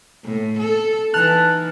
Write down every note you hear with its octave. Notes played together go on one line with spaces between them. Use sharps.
A2
A4
E3 D#4 A5 F6 F#6